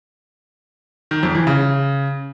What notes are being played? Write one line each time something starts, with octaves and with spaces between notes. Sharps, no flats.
D#3
F2
E3
C#3